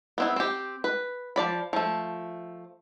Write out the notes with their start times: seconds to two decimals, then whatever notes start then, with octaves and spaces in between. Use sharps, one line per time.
0.18 B3 C4 E4
0.36 C4 G4
0.84 B4
1.36 F3 D5 B5
1.73 F3 A3